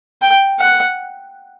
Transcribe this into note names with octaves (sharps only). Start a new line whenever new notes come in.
G5
F#5